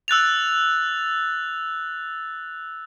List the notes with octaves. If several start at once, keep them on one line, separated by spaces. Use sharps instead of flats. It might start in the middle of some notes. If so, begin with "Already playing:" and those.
E6 F#6 A6 F7